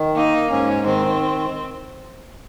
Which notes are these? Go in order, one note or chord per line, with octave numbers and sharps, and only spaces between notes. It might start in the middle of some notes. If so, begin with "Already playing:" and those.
Already playing: D#3
A#3 D#4
G#2 C#4
D#3 C4